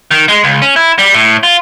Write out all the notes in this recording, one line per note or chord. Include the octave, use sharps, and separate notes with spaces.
D#3
G#3
C#2
C#4
E4
G3
A2
F4